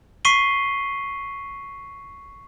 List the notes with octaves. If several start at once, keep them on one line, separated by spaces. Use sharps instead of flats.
C#6 B6 C7 D#7 G7